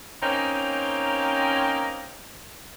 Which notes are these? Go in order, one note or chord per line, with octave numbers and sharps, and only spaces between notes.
A#3 C4 C#4 D#4